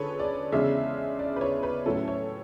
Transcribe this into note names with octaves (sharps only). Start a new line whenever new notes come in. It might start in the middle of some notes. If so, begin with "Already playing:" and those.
Already playing: D3 C#4 G#4 A4 B4 C#5
D5
E2 C#3 G#3 D4 E5
D5
B4
C#5
B4
A2 F#3 C#4 E4 A4
C#5